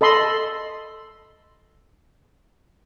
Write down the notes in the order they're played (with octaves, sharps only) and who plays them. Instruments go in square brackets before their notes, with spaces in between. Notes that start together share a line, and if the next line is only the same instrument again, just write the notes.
[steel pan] A4 D#5 B5 C6